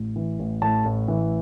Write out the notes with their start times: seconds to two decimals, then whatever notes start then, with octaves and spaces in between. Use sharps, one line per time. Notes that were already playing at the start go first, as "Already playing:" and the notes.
Already playing: A1
0.16 E3
0.39 A1
0.62 A2 A5
0.85 A1
1.08 E3